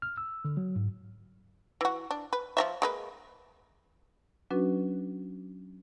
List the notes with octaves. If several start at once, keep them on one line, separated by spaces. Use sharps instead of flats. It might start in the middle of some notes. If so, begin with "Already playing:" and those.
F6
E6
D3
F#3
G#2
E3 F#4
D4
B4
F3 D#5 E5
G#3 A#3 B4
F#3 C#4 D4 F#4 B4